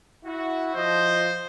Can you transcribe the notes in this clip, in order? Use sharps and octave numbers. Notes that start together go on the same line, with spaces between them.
E4 F#4
F3 C5 D#5